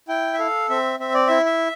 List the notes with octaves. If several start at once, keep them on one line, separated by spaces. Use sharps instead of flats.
E4 G5
E5
A4 F5
C4 E5
C4 E5
D5
E4 E5
E5